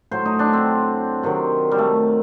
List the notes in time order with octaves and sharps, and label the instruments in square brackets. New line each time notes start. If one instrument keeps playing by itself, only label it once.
[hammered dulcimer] A2 F#3 C5
D#4
D4
C4
C3 D#3 F#3
G3
A3